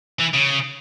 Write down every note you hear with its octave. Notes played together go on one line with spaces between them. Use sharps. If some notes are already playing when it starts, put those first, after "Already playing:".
E3
C#3